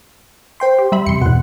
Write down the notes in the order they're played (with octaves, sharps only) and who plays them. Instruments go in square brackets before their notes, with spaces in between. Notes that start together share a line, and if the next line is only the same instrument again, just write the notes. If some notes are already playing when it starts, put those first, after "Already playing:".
[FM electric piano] C5 G5 C6
[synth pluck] G4
G3 E5 B5
[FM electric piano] E2 C3 [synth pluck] C6 C#7
[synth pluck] E2 B2 [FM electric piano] F#5 F#6